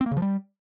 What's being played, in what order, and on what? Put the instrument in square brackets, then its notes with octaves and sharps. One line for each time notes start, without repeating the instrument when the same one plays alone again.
[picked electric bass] C4
A#3
C#3
F3
G3